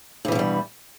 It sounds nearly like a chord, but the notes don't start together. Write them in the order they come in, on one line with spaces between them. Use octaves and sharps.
G2 E3 B2 G#3 G3